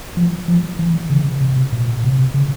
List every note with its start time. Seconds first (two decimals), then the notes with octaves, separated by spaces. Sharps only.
0.17 F3
0.48 F3
0.79 E3
1.10 C#3
1.41 C3
1.72 A#2
2.04 C3
2.34 C#3